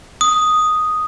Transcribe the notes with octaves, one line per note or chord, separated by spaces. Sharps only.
D#6